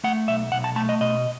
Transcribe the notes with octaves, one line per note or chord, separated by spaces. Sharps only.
A3 F#5
B1 E5
B1 F#5
A5
A3 A5
D#5
B2 D#5